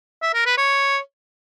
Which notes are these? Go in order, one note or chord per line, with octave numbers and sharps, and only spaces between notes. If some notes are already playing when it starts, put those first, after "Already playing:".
E5
A#4
B4
C#5